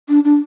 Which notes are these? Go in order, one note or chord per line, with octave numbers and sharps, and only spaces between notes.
D4
D4